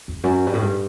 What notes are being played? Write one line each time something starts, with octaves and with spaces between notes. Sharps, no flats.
E2
F#2
G2
A2
G2